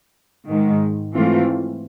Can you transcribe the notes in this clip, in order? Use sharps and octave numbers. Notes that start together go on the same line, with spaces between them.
G#2 D#3 G#3
G#2 E3 A3 C4 F4